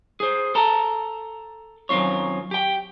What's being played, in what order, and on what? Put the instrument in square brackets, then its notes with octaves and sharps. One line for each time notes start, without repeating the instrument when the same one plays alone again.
[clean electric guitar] G#4 C5
A4 A5 A#5
F#2 D#3 C4 F4 C#5
G4 G5